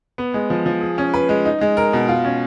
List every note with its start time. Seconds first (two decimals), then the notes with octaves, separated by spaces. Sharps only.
0.18 B3
0.34 G#3
0.50 F3
0.66 F3
0.81 G#4
0.98 C#4
1.14 B4
1.29 G#3
1.45 D#4
1.61 G#3
1.77 A#4
1.93 B2
2.08 F4
2.25 C#4